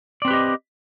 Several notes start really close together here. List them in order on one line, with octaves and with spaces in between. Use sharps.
D5 C4 B4 G4 D#5